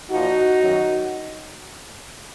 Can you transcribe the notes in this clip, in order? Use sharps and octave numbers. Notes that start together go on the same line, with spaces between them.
A#2 F3 D#4 F#4
F#2 D#3 F#3